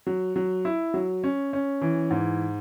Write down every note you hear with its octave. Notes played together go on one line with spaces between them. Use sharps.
F#3
F#3
E4
F#3
C#4
C#4
E3
G#2